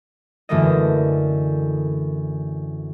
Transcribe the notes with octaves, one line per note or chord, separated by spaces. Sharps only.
F#2 D3 E3 A3 A#3 D#5